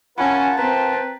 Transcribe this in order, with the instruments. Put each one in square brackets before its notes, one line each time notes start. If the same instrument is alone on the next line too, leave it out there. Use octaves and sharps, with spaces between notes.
[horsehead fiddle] C#4 [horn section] F4 A#4 A5 [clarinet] F#5 [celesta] G#5 B5
[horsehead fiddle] C4 [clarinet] B4 [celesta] A#5